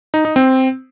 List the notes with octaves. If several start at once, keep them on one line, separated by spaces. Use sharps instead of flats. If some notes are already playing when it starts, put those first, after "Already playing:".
D#4
D#4
C4